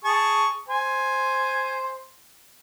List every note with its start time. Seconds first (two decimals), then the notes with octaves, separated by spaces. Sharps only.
0.04 G#4 A5 C#6
0.68 C5 G#5